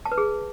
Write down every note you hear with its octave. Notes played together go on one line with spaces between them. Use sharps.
A5
B4
G#4